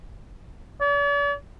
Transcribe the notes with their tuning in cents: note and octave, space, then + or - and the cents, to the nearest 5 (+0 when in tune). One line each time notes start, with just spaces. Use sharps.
D5 -45